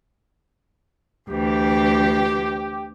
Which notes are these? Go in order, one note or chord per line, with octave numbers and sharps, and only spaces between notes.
D2 E3 G4